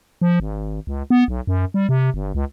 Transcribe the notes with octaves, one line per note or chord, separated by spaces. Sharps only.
F3
G#1
C#2
B3
B1
F#2
G3
C3
G1
C#2